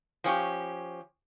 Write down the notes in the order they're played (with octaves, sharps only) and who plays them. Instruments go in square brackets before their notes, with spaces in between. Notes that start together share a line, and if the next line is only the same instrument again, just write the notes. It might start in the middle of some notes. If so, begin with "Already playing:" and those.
[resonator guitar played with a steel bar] F3 C#4 G4